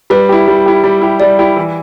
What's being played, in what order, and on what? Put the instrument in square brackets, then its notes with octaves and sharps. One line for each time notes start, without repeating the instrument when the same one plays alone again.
[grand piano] G3 [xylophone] B4
[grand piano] E4 G4
G3
E4 G4
G3
E4 G4
[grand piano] G3 [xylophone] D5
[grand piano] E4 G4
E3